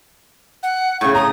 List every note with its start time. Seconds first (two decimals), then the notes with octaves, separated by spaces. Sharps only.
0.63 F#5
1.01 A2 C#3 C#6
1.15 A#5 D#6